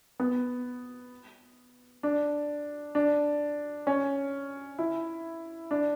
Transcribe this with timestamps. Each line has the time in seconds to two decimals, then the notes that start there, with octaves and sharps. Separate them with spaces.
0.20 B3
2.03 D4
2.95 D4
3.87 C#4
4.79 E4
5.71 D4